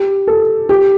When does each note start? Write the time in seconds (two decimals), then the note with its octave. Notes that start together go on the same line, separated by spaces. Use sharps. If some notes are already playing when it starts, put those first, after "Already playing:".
Already playing: G4
0.27 A4
0.69 G4